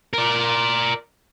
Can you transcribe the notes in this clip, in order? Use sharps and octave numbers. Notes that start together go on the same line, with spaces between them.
A#4 D5